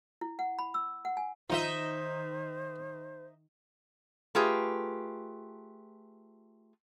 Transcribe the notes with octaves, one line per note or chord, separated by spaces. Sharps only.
E4
F#5
B5
E6
F#5
G#5
D#3 F3 D#4 F4 C5 D#5 E5
A3 F4 G4 G#4 B4